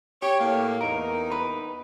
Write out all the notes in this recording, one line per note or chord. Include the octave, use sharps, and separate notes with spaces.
G4 C#5
A2 A#3
E2 D#4 A#4
B4